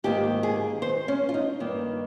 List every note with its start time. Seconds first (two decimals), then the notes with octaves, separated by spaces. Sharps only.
0.04 G#2 D#3 A#3 G4
0.43 G#4
0.82 C5
1.08 C#4
1.29 F4
1.34 D#4
1.60 G2 D#3 A#3